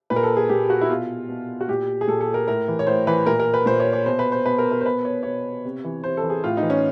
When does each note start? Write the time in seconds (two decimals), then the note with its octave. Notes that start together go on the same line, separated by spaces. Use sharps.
0.10 A#2 B4
0.16 A#4
0.23 A4
0.37 G#4
0.49 A#2 G4
0.70 F#4
0.81 E4
0.89 B2 F4
1.29 B2
1.61 F#4
1.68 A#2 G4
2.01 G#4
2.08 A#2 A4
2.21 A4
2.34 A#4
2.48 A2 A#4
2.68 E3
2.79 C#5
2.87 A2 C5
3.07 E3 B4
3.26 A#2 A#4
3.39 A#4
3.54 B4
3.66 A#2 C5
3.80 C#5
3.93 C#5
4.06 B2 C5
4.19 B4
4.32 C5
4.46 B2 B4
4.58 A#4
4.71 A#4
4.81 C5
4.86 B2 B4
5.05 C#5
5.23 B2 C#5
5.65 C3
5.84 E3
6.03 C3 C5
6.17 A4
6.23 E3
6.30 G#4
6.44 A2 F4
6.57 D#4
6.63 E3
6.70 C#4